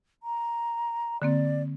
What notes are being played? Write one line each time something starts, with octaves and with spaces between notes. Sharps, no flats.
A#5
D3 A#3 C4 D5